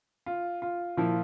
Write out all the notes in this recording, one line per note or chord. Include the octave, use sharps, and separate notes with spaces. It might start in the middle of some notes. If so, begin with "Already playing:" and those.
F4
F4
A#2 F3 E4